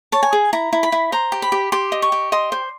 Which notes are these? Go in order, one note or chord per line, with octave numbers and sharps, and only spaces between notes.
C#5 A5
G#5
G#4
E4 A#5
E4
B5
E4
C5 A#5
G4
B5
G4
G4 C6
D#5
C#6
G4
D#5 C6
C5